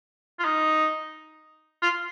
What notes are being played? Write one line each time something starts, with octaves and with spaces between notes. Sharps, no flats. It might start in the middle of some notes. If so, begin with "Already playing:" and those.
F4
D#4
F4